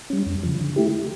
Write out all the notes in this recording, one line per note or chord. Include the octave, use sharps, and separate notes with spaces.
G3 C#4
F2
C#3 F3
D3
A3 E4 G4